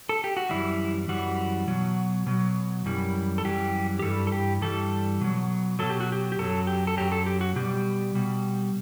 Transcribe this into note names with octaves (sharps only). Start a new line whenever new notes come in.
A4
G4
F#4
F#2 E3 G3 E4
F#2 E3 G3 F#4
B2 F#3
B2 F#3
F#2 E3 G3
A4
F#2 E3 G3 G4
G4
G2 E3 G3 A4
A4
G4
G2 E3 G3 A4
B2 F#3
B2 F#3 A4
G4
F#4
G4
G4
F#2 F#3 A4
G4
A4
F#2 F#3 G4
A4
G4
F#4
B2 G3 G4
B2 G3